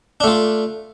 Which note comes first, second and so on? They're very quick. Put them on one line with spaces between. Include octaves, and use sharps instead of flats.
D4 A3 F4